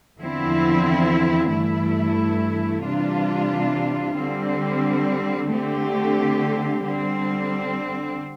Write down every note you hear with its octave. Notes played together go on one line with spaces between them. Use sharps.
E2 D3 F3 C4 E4
G2 E3 A3 E4
C3 E3 G3 D4 F4
D3 G3 C4
D3 A3 C4 G4
D3 G3 C4